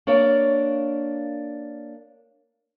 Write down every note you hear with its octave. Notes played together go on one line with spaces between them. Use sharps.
A#3 D4 C#5 D5 F5